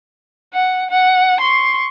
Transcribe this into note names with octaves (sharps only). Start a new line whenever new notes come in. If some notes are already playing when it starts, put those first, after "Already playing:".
F#5
F#5
C6 C#6